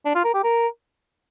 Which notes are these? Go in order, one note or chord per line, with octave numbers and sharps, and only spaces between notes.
D4
F4
A#4
G4
A#4